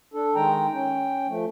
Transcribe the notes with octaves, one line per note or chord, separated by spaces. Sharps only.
D4 A4
D#3 G#3 G5 A#5
C#4 G5
F3 A3